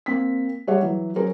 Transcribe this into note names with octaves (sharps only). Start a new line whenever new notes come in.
A#3 C4 B6
G3 G#4 C#5 E5 F#5
E3 F#3
F#3 C#4 G#4 A#4 C5